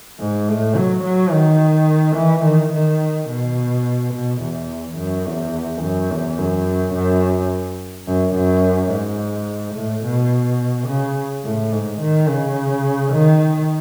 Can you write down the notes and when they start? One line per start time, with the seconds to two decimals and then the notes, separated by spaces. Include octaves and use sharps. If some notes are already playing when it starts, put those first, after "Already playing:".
0.20 G#2
0.48 A2
0.76 F#3
1.04 F#3
1.32 D#3
2.16 E3
2.45 D#3
2.73 D#3
3.29 B2
4.13 B2
4.42 E2
4.97 F#2
5.26 E2
5.82 F#2
6.10 E2
6.38 F#2
6.94 F#2
8.07 F#2
8.35 F#2
8.91 G#2
9.75 A2
10.04 B2
10.87 C#3
11.44 A2
11.72 G#2
12.00 D#3
12.28 C#3
13.13 D#3